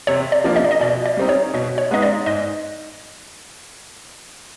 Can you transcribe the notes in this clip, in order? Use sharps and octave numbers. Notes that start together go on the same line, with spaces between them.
C3 C#5
D5
F3 A#3 D4 F4
D#5
D5
D#5
B2 D5
D5
G3 C4 D#4
C#5
B2 D#5
C#5
G#3 B3 D#4 D#5
D5
G#2 D#5